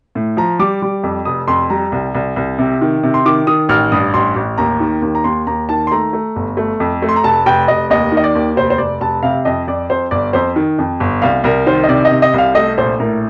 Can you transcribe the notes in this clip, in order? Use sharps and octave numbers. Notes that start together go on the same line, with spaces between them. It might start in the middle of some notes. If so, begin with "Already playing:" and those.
A2
F3 A#5
G3 D6
G3
F2
F1 D#6
F2 C6
G3 A#5
C2
C2
C2
C3
D#3
C3
C6
D#3 D6
D#3 D#6
A1 F6
G2 D#6
A1 C6
A1
D#2 A#5
D#3
D#2
A#5
D#2 C6
D#2 A#5
D#3 A5
C6
A3 A#5
A3
G1
A3
F2
A3
C6
A#5
F1 A5
F1 G5
F1 D#5
D#2 D#5
D#3
D#5
D5
D#2
F1 C5
C5
F1 D5
F1 A5
C3 F5
F2 D#5
F2 D5
F2 C5
G1 D5
F2 C5
D#3
F2
G1
C2 F5
C2 A#4
D#3 C5
D#5
C3 D5
D#5
C3
D#5
C2 F5
A3 D#5
A#1 C5
A2 A#4